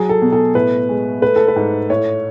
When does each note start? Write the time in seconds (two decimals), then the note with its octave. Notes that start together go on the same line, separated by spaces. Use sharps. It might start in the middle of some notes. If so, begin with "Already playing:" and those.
Already playing: F#3 G#4
0.09 A4
0.22 B2
0.32 A4
0.55 A2 B4
0.89 G#3
1.22 A3 B4
1.36 A4
1.48 B4
1.56 G#2
1.89 A2 C#5